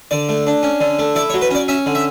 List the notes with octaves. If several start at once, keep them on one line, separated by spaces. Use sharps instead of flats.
D3 D5
A3
D4
C#4
D3
A3
E4 D5
C#5
F#3
B4
C#4 D5
C#4 E5
D3
E5